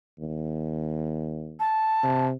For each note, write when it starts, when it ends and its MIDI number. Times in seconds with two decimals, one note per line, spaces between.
0.19 1.62 39
1.60 2.26 81
2.03 2.32 48